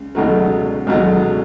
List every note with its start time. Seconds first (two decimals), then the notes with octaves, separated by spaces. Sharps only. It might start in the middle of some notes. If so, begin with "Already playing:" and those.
Already playing: C#2
0.15 C#2 B2 F#3 A3
0.87 C#2 B2 F#3 A3